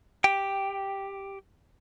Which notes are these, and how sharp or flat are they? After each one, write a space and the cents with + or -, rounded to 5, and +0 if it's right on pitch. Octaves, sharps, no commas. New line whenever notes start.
G4 +0 G5 +0